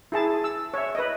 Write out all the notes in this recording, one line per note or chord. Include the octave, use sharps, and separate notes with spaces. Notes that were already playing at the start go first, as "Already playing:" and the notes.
E4 G#4 A5
E6
C#5 E5
B4 D#5